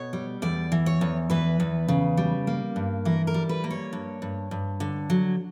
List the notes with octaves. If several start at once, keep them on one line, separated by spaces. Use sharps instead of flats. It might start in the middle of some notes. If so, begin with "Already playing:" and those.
Already playing: B2 C#5
G3
E2 D5
E3
C#5
E2
E3 B4
E2
C#3
G3
A#3
G2
E3 A#4
A#4
G3
B4
A#3
C#5
G2
G2
G2
D3
F#3